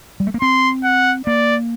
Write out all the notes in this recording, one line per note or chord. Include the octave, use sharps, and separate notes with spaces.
G3
A3
A#3
C4 C6
F#5
A#3 D5